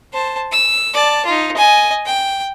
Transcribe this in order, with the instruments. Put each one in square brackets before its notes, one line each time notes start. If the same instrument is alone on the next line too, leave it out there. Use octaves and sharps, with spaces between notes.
[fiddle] C5 A5
E6
D5 A5
D#4 F4
D#5 G#5
G5